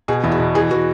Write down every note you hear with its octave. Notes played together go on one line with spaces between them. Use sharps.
B2 G#4
E2 E4
F#4
B2
E3 G#4
E3 F#4